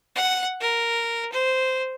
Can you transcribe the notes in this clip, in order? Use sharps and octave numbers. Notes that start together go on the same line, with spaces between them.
F#5
A#4
C5